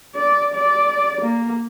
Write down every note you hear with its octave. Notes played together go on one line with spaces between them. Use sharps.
D5
D5
A#3